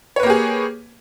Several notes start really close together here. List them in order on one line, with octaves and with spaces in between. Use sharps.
C#5 B4 A#3 G4 G#4